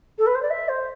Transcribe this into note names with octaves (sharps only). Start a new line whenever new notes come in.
A4
B4
C5
D5
E5
C5